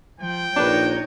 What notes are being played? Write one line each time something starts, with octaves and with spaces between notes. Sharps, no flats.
F3 G5
A#1 D4 D#4 B4 C#5